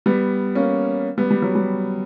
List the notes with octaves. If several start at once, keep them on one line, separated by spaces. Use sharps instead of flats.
G3 B3
A#3 C#4
G3 B3
G3
F#3
G3